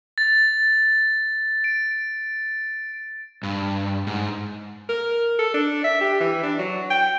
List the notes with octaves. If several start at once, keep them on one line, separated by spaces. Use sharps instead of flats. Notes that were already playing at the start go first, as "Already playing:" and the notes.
A6
D7
G2
G#2
A#4
A4
D4
E5
G4
E3
D4
F#3
G5